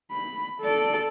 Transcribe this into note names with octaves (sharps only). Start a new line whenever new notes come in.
B5
A4 D5